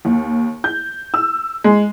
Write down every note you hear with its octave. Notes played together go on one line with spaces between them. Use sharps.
D#2
G6
E6
G#3